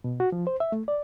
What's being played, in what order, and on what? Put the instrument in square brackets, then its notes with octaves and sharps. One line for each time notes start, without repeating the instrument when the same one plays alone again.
[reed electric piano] B2
F#4
F3
C5
E5
A3
D5